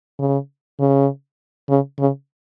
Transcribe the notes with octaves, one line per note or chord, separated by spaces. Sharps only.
C#3
C#3
C#3
C#3